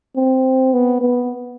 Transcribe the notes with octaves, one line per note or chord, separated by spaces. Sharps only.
C4
B3
B3